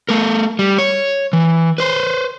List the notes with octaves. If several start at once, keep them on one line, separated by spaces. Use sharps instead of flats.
A3 A#4
G3
C#5
E3
B4 C5